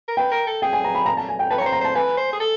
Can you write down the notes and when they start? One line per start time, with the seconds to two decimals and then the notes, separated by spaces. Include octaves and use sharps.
0.08 A#4
0.17 B4 G5
0.31 A#4
0.47 A4
0.62 G#4 G5
0.73 G#5
0.84 A#5
0.95 B5
1.06 A#5
1.17 A5
1.29 G#5
1.39 G5
1.50 B4 A5
1.58 C#5
1.62 A#5
1.66 C5
1.72 A#5
1.81 C5 A5
1.95 B4 G#5
2.17 C5
2.33 G#4
2.40 A4